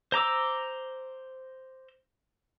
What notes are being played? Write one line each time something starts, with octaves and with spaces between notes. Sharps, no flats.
C5 A#5 D6 E6